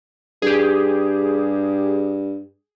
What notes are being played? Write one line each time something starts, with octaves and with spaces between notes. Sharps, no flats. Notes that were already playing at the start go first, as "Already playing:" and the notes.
G2 G4 G#4